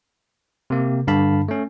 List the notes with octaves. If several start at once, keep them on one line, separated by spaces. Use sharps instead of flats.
C3 A#3
G2 D3 F5 A5 B5
A3 C#4